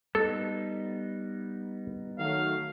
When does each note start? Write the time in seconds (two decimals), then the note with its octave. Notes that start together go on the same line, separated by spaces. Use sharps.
0.15 G3 B3 D#4 A4
2.19 D#3 F#3 A3 F5